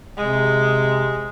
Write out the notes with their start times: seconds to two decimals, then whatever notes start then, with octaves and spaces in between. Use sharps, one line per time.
0.17 C3 G#3